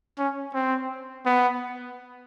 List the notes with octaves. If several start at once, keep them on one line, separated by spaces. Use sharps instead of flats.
C#4
C4
B3